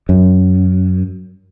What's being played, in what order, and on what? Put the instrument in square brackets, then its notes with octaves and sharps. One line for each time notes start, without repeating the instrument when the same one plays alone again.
[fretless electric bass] F#2